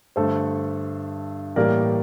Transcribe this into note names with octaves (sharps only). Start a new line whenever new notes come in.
G2 D3 A3 A4 C5
A2 E3 G3 A#3 A#4 D5